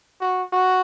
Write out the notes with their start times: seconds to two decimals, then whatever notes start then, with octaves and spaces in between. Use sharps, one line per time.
0.20 F#4
0.53 F#4